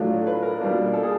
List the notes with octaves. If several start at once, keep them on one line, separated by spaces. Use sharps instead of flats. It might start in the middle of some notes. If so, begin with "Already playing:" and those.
Already playing: A2 F#3 A3 D4 F4
B4
A#4
B2 G3 A#3 D4 F4
A4
G#4